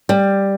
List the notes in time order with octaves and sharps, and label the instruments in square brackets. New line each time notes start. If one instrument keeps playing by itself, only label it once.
[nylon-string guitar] G3